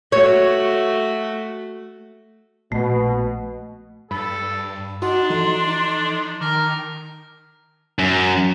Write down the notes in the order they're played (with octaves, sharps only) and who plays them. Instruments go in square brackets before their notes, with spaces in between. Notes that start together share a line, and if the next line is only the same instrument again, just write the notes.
[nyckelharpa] A3 F#4 [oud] C#5
[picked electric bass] A#1 [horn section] B2 [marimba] A3
[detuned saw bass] G2 [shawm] A4 [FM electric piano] B5
[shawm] D4 [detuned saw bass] D#4 [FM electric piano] F#4 D#5 F#5 [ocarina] C6
[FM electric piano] E3 F3 A4
[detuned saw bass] D#4
[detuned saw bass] D#3 [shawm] A#4 [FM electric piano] A5 D6
[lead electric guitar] F#2